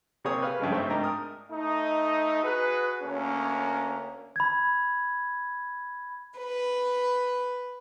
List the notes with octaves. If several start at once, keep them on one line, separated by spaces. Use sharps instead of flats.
C3 A#3 C4 G#4 C#5 D#6
B4 F5
G2 C#3 F3 G#3
A3 C4 D#4 C#5 E5
G#2 D4 A#4 G5
D#6 F6
A3 D#4
F#4 G#4 B4
D2 A#3 C#4
B5 G#6
B4